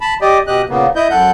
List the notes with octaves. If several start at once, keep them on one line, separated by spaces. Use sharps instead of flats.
A5 B5
G4 D5 D#5
B2 G4 D#5 F#6
A#2 C#3 A#3 B3
E4 D#5 G6
F#2 A4 F#5 G6